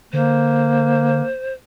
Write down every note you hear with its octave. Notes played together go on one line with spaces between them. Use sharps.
D3 A#3 C5